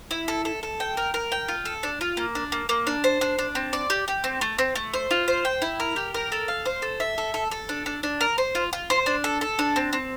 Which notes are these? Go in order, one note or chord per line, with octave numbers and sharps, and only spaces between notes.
E4
A4
A4
A4
G5
A#4
A#4
G5
F4
A4
D4
F4
A#3
D4
A#3
A#3
D4
C5
D4
D4
C4
D5
G4
G4
C4
A3
C4
A3
C5
F4
C5
G5
E4
A#4
G4
A#4
A4
F5
C5
A4
E5
A4
A4
A4
D4
D4
D4
A#4
C5
F4
F4
C5
D4
A4
A4
D4
C4
C4